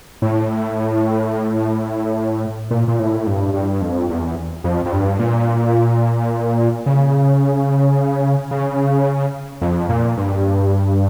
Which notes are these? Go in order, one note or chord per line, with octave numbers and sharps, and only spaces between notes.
A2
A#2
A#2
A2
G2
G2
F2
E2
F2
F2
G2
A#2
C#3
C#3
F2
A#2
G2